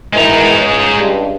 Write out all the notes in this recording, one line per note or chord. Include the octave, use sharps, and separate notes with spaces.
B2 D#3 E3 G#3 A#5
C#2
C#2 G2